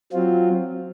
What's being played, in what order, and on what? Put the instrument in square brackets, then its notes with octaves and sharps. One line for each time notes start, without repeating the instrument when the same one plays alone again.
[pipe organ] F#3 C4 F4